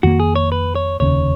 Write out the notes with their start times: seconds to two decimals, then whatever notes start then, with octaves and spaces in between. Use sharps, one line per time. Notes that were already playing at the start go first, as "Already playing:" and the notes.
0.03 F2 D#3 A#3 F#4
0.20 G#4
0.36 C#5
0.52 B4
0.75 C#5
1.00 F1 D#2 C#3 C#5